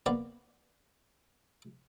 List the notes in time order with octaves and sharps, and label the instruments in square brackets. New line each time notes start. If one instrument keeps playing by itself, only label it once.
[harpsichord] A#3 B3 D5